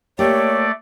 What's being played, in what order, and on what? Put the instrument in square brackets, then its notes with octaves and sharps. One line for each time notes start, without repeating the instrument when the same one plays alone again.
[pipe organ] A3 D5 [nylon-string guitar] A#3 G4 [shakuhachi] C#5